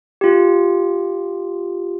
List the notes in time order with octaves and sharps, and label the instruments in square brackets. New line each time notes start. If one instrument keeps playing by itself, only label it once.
[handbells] F4 G4